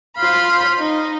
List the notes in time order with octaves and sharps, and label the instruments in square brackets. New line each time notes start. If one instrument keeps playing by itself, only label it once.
[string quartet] F4 C5 F5 B5 C6
D#4